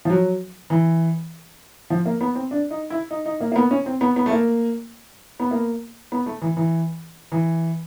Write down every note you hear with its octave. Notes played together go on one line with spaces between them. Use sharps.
F3
F#3
E3
F3
A#3
B3
C4
D4
D#4
E4
D#4
D#4
A#3
A#3
B3
C#4
C4
B3
B3
A3
A#3
B3
A#3
B3
A3
E3
E3
E3